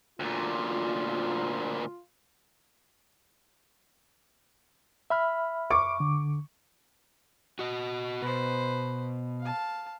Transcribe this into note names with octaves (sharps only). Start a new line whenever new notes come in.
D2 A#2 F4
E5 B5 F6
C#6 D6
D3
F#4 D#5
B2 B4 C5
F5 A5